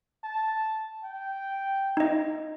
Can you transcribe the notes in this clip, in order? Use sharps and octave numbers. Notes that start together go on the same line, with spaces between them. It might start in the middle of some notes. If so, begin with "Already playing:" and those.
A5
G5
D#4 D#5